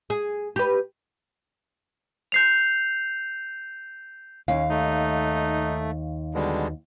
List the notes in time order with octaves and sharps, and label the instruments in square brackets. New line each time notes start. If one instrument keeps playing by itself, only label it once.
[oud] G#4
G4 B4
[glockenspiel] G6 C7 F7
[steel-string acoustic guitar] D#2 F5 [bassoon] C#4
[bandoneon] A3 [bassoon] D#4
[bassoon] B2 [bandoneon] D3 G3 G#3